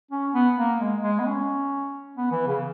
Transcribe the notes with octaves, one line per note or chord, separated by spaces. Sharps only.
C#4
B3
A#3
G#3
G#3
B3
C#4
B3
E3
C#3